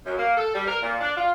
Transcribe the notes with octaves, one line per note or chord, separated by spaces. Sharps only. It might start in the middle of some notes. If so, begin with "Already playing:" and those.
F#2
A#3
A4
G3
A#4
A#2
D4
F4